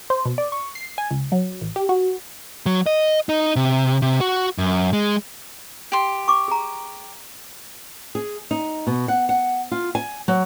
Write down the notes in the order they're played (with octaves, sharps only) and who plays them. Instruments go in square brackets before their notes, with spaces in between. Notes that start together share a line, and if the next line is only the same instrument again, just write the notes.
[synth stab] C5
B2
D5
C#6
C7
G#5
C#2
F#3
A1
G4
F#4
[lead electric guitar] F#3
D#5
D#4
C3
C3
F#4
F#2
G#3
[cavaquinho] G4 C6
[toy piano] C#6 D6
G#4 A#5
[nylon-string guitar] G#4
D#4
B2
F#5
F#5
F4
G#5
F#3